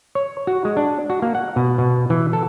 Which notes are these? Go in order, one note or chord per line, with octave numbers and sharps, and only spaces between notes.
C#5
F#4
G#3
D4
F#4
A#3
F#5
B2
B2
E3
A4